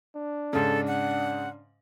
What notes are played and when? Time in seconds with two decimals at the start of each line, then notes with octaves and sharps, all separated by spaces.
0.16 D4
0.53 G#2 C#3 A4
0.87 F#5